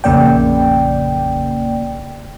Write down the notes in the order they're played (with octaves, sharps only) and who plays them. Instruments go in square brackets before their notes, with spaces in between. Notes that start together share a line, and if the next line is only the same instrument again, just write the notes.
[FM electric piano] A#1 F2 C#3 A#3 D5 G5